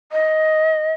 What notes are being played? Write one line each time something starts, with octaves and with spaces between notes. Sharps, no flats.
D#5